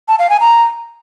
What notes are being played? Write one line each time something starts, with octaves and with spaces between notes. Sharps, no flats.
A5
F5
G#5
A#5